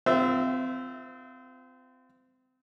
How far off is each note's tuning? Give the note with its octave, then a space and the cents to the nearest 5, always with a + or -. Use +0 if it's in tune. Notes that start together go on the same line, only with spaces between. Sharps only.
C4 -30 F4 +0 E5 +0